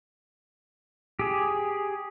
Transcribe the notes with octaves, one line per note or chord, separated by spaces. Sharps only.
G4 G#4